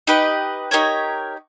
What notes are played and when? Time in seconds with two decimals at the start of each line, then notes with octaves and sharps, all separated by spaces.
0.07 D#4 G4 B4 D#5
0.71 D#4 G4 A#4 C#5